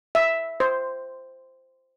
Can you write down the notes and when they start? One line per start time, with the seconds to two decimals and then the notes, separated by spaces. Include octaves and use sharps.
0.15 E5
0.60 C5